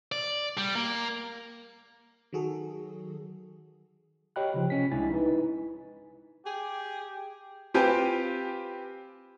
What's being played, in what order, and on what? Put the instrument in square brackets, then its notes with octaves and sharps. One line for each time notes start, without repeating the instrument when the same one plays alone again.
[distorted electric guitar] D5
G3
A#3
[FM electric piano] D#3 F#3 F#4 G#4 A4
[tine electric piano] G4 C#5 D#5 G5 B5 F#6
C#3 F3
C3 C#4 B6
C2 G#3 D4 E4 G#5 A6
D#4 E4 B4
[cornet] G4 [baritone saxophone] G#4
[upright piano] C4 F4 G4 B4 G5 G#5